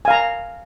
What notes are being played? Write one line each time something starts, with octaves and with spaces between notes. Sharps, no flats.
F5 G#5 A#5